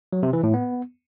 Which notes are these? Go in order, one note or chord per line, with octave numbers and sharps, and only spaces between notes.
F#3
C3
E3
A2
B3